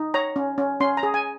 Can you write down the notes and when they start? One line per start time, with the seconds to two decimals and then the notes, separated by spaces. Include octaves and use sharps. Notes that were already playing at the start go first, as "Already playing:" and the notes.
Already playing: D#4
0.14 C#5 A#5
0.36 C#4
0.58 C#4
0.80 C#4 C6
0.97 A#5
1.03 G#4
1.14 G#5